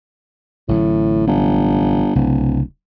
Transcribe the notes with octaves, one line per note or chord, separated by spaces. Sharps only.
A1 A2 D3 F#3
G1
D1 C2 C#3